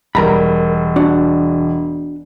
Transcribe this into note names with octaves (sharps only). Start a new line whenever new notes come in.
E1 G3 A#4 A#5 B5
D4 F#4